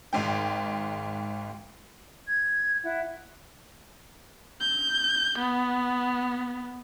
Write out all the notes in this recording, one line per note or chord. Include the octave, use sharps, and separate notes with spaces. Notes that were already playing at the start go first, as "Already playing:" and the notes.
G#1 G#2 G5
G#6
E4 F#5
G6
B3